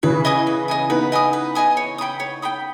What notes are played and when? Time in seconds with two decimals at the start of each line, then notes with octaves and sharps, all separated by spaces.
0.03 C#3 E3 B4
0.25 D#5 G#5 D#6
0.47 B4
0.68 D#5 G#5 D#6
0.89 B3 D#4 B4
1.12 D#5 G#5 D#6
1.33 B4
1.55 D#5 G#5 D#6
1.77 C#5
1.98 G5 B5 D#6
2.20 C#5
2.42 G5 B5 D#6